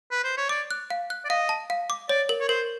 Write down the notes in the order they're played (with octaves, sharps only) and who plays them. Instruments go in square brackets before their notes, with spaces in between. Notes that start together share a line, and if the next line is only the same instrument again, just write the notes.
[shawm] B4
C5
C#5
[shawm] D5 [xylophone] D6
[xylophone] F#6
F5
F#6
[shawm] D5
[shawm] D#5 [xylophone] F5
[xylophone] A5
F5
D6
[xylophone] C#5 [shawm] D5
[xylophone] A#4
[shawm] C#5
[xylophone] A#4 [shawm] C5